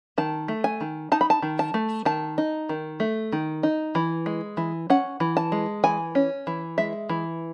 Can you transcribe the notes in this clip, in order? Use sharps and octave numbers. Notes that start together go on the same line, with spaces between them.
D#3 A5
A3
G#5
D#3
D#4 A5
B5
A5
D#3
A5
A3
D#3 A5
D#4
D#3
A3
D#3
D#4
E3
G#3
E3
C#4 F#5
E3
A5
G#3
E3 G#5
C#4
E3
G#3 E5
E3